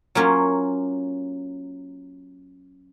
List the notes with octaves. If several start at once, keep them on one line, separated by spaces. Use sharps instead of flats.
F#3 A#3 C#4 F4